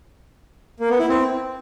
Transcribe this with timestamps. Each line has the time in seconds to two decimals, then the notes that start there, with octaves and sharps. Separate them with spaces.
0.80 A#3
0.90 B3
0.99 E4
1.09 C4